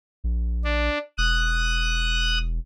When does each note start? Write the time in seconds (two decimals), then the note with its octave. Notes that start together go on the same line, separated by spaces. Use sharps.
0.24 A#1
0.64 D4
1.18 E1 D#6 F#6